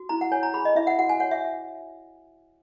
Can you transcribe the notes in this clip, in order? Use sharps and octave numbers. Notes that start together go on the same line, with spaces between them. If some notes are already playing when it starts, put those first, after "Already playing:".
Already playing: F#4
E4 A#5
F#5
C#5 G#5
A#5
G#4 B5
D#5
E4 E5
F#5
F#4 F#5
G#5
C#5 F#5
E5